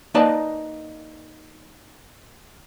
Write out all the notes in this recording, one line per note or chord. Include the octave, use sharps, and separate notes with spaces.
A#3 D#4 B4 D5 D#5 A5